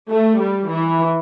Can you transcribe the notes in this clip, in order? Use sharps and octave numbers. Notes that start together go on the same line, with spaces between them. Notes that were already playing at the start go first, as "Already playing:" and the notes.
A3
G3
E3